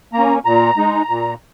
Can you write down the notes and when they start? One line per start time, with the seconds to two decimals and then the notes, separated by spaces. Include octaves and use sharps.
0.13 A#3 A#5
0.18 C#4
0.45 A#2 A#5
0.77 G#3 D#4
1.09 A#2